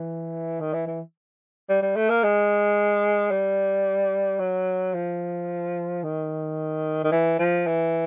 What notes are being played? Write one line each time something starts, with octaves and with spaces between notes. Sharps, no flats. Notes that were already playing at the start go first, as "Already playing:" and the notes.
Already playing: E3
D#3
E3
E3
G3
G3
A3
A#3
G#3
G3
F#3
F3
D#3
D#3
E3
F3
E3